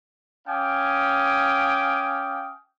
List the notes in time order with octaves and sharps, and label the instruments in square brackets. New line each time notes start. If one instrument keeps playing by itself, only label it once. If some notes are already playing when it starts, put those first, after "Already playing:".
[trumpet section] C#4 F5 G5 G#5 D6 D#6